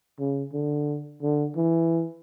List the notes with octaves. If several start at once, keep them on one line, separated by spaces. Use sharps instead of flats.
C#3
D3
D3
E3